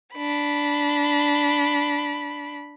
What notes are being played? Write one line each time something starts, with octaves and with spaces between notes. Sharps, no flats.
D4 B5